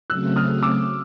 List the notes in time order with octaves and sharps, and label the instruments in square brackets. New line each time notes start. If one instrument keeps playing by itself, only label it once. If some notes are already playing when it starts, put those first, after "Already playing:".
[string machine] C#3 F#3 A3 C4 [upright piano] E6 F#6
[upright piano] D#6 F6
D6 E6